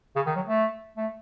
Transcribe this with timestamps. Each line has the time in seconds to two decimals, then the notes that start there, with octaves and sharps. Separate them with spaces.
0.16 C#3
0.26 D#3
0.36 F#3
0.47 A3
0.97 A3